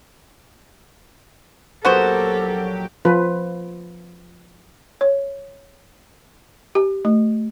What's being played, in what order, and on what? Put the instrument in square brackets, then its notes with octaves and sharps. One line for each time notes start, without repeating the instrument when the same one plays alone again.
[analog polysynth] A#1 F#3 G4 [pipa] B3 F#4 C5 [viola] A4 A#4
[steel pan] F3 F4 B4
[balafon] C#5
G4
A3